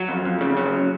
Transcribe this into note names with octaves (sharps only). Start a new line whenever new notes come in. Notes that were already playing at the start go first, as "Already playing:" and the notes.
Already playing: F#3
F2
F2
C#3
F#3